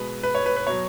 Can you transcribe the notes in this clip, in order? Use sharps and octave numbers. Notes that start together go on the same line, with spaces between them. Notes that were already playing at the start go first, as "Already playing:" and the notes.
Already playing: B2 G#3 B4
B4
C#5
B4
B4
B2 F#3 C#5